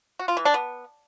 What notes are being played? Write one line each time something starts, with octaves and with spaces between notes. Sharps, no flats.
F#4
F4
E3
D4
B3